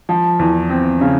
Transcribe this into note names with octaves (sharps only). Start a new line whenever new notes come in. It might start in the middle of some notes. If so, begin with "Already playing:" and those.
F3
E2
C4
C#3